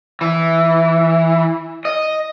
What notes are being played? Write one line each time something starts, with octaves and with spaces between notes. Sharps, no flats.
E3
D#5